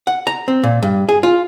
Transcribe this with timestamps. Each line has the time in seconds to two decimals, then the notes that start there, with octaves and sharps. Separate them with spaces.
0.07 F#5
0.27 A#5
0.48 C4
0.63 A#2
0.83 G2
1.09 G#4
1.23 F4